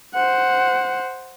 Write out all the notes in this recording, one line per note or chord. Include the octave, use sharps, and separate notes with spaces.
C5 F#5